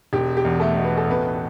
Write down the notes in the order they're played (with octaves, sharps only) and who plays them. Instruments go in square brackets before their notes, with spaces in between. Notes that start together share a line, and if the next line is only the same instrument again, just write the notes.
[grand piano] E1 [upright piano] G4
[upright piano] G4
[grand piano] E2
[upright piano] A3 A4
[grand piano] B2
[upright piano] B4
A4
[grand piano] A1 [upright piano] B3 B4